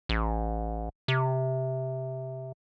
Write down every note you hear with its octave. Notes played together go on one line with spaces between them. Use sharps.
A1
C3